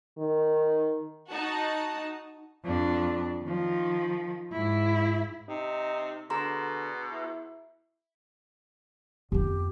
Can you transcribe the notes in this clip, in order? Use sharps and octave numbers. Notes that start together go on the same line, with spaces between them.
D#3
D#4 F#4 A5
F2 D4
D#3 F3
G#2 E4
C3 D#4
B2 D3 G#4 A#5 C6
E4
F2 B3 G4